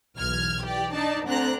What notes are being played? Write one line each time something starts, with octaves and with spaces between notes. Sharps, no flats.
B1 E2 F6 G#6
E3 G4 D5
D4 D#4 D5 A5
D2 C4 D4 A#5 F#6